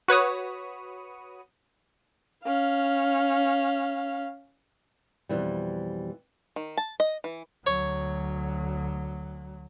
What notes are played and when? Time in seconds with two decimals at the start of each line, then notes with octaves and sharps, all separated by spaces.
0.08 F#4 B4 C#5 D#6
2.44 C#4 F5
5.29 F2 B2 E3 G3
6.56 D#3
6.77 A5
7.00 D#5
7.24 E3
7.66 D2 F#3 C#5